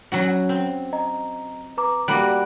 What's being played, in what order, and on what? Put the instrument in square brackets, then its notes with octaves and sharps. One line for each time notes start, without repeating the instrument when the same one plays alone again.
[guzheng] F#3 C#4 F#4
C4
[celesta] D#5 A#5
B4 A#5 D6
[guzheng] G3 A#3 F#4 [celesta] F#6 D7